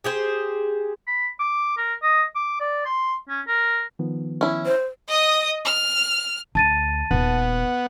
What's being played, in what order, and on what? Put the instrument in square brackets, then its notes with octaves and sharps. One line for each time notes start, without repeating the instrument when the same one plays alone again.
[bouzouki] G4 G#4 C5
[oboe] B5
D6
A#4
D#5
D6
D5
C6
C#4
A#4
[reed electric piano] D#3 F3 B3
[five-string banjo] C#4 E4
[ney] C5
[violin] D#5 D#6
F6
[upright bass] D2 [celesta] A5 A6 D#7
[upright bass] D#1 [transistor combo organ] B3 F#5